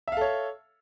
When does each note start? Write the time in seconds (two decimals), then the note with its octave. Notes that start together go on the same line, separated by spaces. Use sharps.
0.08 E5
0.12 F5
0.17 A4
0.21 C#5